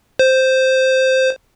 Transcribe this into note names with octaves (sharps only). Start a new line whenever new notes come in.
C5